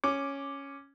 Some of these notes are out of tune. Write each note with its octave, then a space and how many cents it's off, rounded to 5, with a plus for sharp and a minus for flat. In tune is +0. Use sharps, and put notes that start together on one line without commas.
C#4 +0 D6 +0